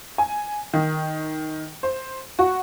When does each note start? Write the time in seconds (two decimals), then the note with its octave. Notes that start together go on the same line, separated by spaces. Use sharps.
0.18 G#5
0.74 D#3
1.83 C5
2.39 F#4